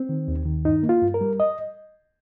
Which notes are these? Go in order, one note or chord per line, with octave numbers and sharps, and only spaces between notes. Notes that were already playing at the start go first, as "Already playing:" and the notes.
Already playing: C4
D#3
D#2
D#3
G2 D#4
A#3
F4
G2
A#4
G3
D#5